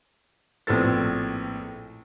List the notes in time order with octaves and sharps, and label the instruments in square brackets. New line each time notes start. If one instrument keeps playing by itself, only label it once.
[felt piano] A#1 A2 B3 C4 A4 A6